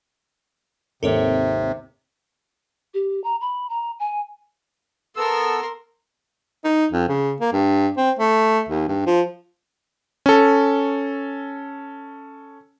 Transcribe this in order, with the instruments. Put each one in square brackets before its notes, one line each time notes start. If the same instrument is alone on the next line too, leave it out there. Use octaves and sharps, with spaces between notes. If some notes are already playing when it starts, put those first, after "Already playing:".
[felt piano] G#1 D#2 [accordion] C3 [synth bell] A4 A#4 C#5
[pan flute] G4
A#5
B5
A#5
G#5
[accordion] B3 A4 E6 [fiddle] A#4 C6
[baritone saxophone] D#4
F2
C#3
A#3
G2
C4
A3
D#2
G2
F3
[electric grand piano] C#4 A4